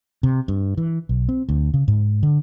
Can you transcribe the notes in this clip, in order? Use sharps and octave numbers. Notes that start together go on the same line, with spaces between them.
C3
G2
E3
B1
C4
D2
C#3
G#2
D3